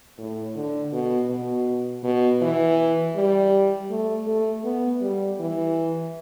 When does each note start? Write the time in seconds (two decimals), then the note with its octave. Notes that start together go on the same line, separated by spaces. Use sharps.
0.19 A2
0.56 D3
0.93 B2
1.30 B2
2.04 B2
2.42 E3
3.16 G3
3.90 A3
4.27 A3
4.64 B3
5.01 G3
5.40 E3